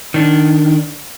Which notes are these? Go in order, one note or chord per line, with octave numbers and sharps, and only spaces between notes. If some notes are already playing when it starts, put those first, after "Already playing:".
D#3 D4